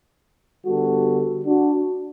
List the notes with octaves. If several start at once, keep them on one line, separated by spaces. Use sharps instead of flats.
D3 G3 B3 F#4 A4
D4 F#4